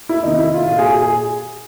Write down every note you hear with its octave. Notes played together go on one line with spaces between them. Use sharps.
E4
C3 D#3 D#4
E4
F4
A#2 F4
G#4
G#4
G#4